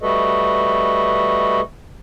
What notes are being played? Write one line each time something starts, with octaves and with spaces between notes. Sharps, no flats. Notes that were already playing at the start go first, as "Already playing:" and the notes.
G3 A3 F#4 A4 B4 D#5